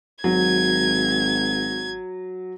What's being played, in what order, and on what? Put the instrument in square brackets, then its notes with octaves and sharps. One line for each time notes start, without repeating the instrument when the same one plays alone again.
[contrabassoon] G#1 [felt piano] F#3 [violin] G#6